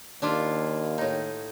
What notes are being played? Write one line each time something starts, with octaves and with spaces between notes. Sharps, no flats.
D#2 D4 E4 F4
A2 D#4